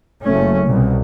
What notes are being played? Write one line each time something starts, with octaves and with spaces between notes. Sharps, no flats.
F#1 A3 C#4
C2 B2